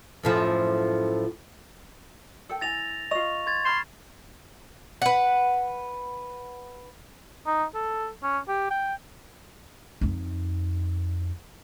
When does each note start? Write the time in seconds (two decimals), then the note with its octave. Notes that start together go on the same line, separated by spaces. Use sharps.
0.23 F#2 A2 F3
2.49 A4 G5
2.61 E4 G#5 A6 A#6 F7
3.11 F4 D#5 C#6 F7
3.46 C6 G#6 A6
3.65 B5 C6 F6 E7
5.02 B4 F#5
7.47 D#4
7.75 A4
8.23 C#4
8.48 G4
8.70 G5
10.01 F2 D#4